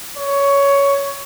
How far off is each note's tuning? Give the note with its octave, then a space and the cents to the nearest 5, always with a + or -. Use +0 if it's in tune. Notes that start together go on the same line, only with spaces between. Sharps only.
C#5 +15